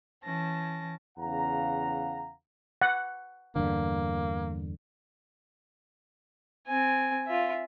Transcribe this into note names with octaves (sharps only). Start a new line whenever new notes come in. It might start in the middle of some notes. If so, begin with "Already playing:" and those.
E3 C#4 A5 A#6
E2 C#3 F5 F#5 A#5
F#5
E2 G2 D3 A#3
C4 G#5
F4 E5